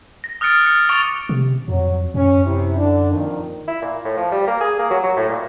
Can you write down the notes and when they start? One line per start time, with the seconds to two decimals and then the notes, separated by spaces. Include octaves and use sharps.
0.24 A#6
0.41 D#6 F6 F#6 A6 C#7 D7
0.66 F6 C#7
0.89 C#6 D6 A6 D7 F7 G7
1.29 C3
1.68 F2 F#3
2.14 F#2 C#4
2.46 C3 E4
2.78 D3 D4
3.12 F2 A#2 D#3
3.68 E4
3.82 A#2
4.05 A2
4.17 F3
4.32 G3
4.47 A#3
4.61 G#4
4.79 A#3
4.91 F#3
5.04 F#3
5.17 A2
5.30 A#2